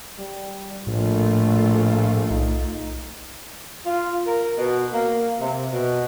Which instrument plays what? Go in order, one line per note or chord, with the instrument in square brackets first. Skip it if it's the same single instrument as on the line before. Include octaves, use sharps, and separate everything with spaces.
[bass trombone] G3
[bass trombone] A#1 [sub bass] A2 [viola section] A3 F4
[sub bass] B1 [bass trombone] D#4
[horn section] F4
A#4
B2
A#3
C3
B2